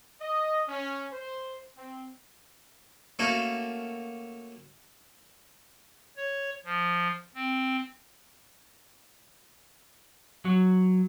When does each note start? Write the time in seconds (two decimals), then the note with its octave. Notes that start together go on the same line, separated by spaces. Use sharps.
0.20 D#5
0.68 C#4
1.12 C5
1.76 C4
3.19 A3 A#3 C#4 F#4 A4 F5
6.17 C#5
6.65 F3
7.35 C4
10.45 F#3